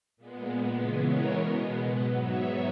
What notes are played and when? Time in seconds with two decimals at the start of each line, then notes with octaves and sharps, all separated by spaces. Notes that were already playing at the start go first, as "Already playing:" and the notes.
0.17 A#2 G#3 B3
0.75 C#3 E3 G#3 B3 G#4 B4
1.04 A#4 C#5
1.33 B2 G#3 B3 B4 D#5
1.91 G#2 F#3 B3 D#5 F#5
2.20 C#5 E5